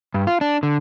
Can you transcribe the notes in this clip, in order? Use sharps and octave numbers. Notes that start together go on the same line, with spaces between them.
G2
F4
D4
D3